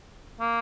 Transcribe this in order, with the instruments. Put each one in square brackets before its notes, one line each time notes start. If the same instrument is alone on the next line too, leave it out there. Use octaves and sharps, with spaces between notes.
[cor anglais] A#3